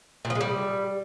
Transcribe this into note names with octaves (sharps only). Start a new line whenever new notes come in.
A#2
F3
G#3
G3